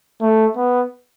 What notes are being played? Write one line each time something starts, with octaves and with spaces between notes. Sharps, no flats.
A3
B3